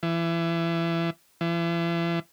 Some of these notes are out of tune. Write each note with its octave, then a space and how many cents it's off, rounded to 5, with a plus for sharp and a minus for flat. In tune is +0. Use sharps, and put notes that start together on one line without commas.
E3 +25
E3 +40